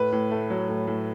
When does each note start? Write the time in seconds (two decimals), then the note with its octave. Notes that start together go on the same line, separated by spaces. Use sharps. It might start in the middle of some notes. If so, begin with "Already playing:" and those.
Already playing: A2 B4
0.12 A2
0.31 A3
0.50 F#3
0.69 A2
0.87 A2